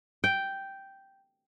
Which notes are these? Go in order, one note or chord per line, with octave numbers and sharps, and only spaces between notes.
G5